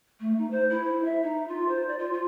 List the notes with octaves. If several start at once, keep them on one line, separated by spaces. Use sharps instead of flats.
A3
D#4
C5
E4
E5
D#4
F4
C5
D5
F4
F4